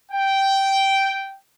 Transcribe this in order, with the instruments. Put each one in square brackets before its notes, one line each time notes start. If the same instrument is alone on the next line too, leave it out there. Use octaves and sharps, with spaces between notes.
[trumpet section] G5